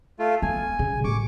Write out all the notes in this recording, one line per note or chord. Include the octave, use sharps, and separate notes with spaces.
A3 F4
B3 G#5
C#3
A1 C#6 D6